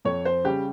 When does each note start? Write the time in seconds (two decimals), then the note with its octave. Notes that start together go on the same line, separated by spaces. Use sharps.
0.05 F2 C#5
0.25 C5
0.44 C#3 G3 G4